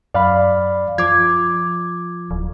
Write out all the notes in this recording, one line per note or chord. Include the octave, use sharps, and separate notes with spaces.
F#2 D5 F5 B5
F3 D6 G#6
D1